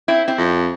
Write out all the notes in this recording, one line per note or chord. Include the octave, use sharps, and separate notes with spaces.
C4 E4
C4 E4
F2